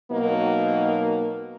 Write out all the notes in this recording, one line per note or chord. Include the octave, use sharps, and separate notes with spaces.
B2 F#3 A#3 D#4